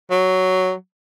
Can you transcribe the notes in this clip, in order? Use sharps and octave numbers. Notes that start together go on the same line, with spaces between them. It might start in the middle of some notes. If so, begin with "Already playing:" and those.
F#3